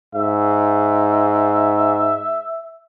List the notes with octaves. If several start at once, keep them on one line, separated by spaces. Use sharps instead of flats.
G#2 E5